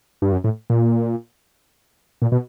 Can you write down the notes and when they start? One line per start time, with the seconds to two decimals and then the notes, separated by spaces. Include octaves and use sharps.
0.22 G2
0.32 F#2
0.44 A2
0.70 A#2
2.22 A#2
2.32 B2